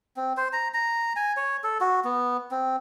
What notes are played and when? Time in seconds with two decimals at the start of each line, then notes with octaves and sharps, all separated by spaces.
0.17 C4
0.37 C5
0.53 A#5
0.74 A#5
1.16 G#5
1.37 C#5
1.64 A4
1.81 F#4
2.04 B3
2.51 C4